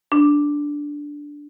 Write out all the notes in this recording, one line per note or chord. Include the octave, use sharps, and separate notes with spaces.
D4